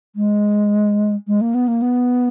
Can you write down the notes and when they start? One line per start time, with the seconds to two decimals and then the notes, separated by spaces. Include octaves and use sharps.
0.16 G#3
1.28 G#3
1.41 A#3
1.54 B3
1.68 A#3
1.82 B3